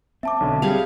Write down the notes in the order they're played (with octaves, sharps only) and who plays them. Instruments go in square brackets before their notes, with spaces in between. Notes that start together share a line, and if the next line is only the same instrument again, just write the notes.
[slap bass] C4 [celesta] E5 A5 D6
[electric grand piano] B1 D3
[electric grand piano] G3 [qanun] G4 G#4 F5